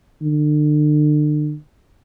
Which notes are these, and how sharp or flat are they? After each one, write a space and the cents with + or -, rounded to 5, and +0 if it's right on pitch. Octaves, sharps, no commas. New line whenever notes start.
D3 +35